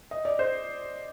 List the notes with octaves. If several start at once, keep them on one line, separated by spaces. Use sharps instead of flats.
D#5
D5
C5